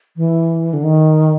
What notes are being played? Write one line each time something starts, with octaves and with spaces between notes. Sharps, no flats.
E3
D3
D#3